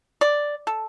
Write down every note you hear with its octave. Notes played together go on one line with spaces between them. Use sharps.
D5
A4